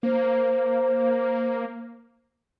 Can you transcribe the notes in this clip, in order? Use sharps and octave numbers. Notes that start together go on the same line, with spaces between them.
A#3 C5